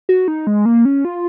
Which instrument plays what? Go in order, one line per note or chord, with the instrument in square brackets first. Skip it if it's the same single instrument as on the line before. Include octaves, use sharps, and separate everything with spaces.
[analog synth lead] F#4
D#4
G#3
A#3
C#4
F4